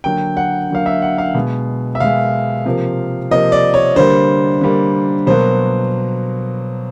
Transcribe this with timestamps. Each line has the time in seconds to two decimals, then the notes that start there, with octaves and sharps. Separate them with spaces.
0.04 D3 F#3 A#3 G5
0.37 F#5
0.70 D3 F#3 A#3 F5
0.86 E5
1.02 F#5
1.18 F5
1.35 B2 G#3
1.95 E5
2.00 B2 G#3 F5
2.65 C3 F3 A#3
3.31 C3 F3 A#3 D#5
3.52 D5
3.74 C#5
3.96 D3 G3 A#3 C5
4.61 D3 G3 A#3
5.27 B2 F#3 A#3 C5